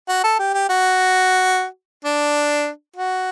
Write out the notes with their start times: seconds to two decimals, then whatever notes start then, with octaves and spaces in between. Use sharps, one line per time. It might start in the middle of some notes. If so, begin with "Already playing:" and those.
0.09 F#4
0.24 A4
0.39 G4
0.54 G4
0.69 F#4
2.05 D4
2.96 F#4